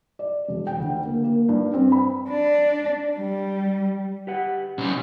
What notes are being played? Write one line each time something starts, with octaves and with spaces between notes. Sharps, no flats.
D5
E1
G5
D2
A#3
A#3
G2
C4
B5
D4
G3
G4 B4 F#5
B1 G3 C#4